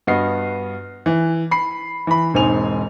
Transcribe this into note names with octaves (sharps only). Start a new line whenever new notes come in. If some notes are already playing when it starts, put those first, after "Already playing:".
G2 B3 F#4 D#5 F6 C7
E3
B5 C7
E3 B5
E1 G#2 C4 D#4 G#5 F7